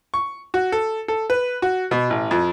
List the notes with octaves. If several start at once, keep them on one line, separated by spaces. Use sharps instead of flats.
C#6
F#4
A4
A4
B4
F#4
B2
A1
F2